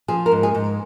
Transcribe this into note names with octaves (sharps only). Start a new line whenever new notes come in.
F3 G#4
A#4
G#2
G#4
G#2